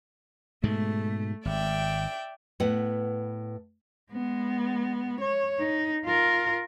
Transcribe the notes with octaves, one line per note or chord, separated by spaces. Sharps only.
G#2 B2 G#3 A3
G#1 D5 E5 G5
A2 B3 B4 F#5
G#3 B3
C#5
D#4
F4 A#4